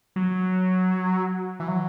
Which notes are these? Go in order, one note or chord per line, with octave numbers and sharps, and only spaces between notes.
F#3
E3
F#3